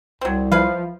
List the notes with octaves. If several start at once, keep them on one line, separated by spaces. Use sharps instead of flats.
C2 F#3 C4
F3 E4 B4 F5